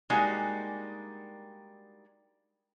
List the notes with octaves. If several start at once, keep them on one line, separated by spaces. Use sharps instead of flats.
G3 G#3 A#3 D4 D#4 F#4